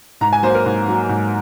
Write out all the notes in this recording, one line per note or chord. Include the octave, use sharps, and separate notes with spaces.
G#2 A#5
G#5
F#3 A#3 C5
A#4
G#2
F#3 A#3
G#2